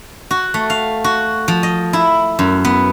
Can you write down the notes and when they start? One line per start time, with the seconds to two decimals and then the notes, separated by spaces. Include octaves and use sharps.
0.31 F#4
0.54 A3
0.70 F5
1.04 F#4
1.48 F3
1.63 D#5
1.93 E4
2.39 F#2
2.65 B3